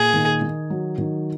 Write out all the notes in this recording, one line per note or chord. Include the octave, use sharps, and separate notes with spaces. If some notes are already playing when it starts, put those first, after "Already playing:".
Already playing: A#2 G#4
D#3
D#3
F#3
D#3